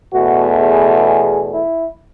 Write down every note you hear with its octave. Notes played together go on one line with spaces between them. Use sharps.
E2 B2 A3 F#4
G#4
G#4
E4